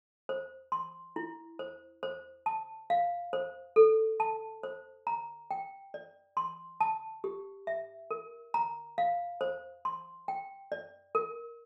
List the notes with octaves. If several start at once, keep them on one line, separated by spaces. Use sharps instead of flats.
C5
C6
E4
C5
C5
A5
F5
C5
A4
A5
C5
A#5
G5
D5
C6
A5
G4
E5
A#4
A#5
F5
C5
C6
G5
D5
A#4